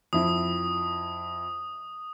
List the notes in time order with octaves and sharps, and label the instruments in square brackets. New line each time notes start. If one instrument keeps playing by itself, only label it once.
[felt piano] F2 E4 [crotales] D#6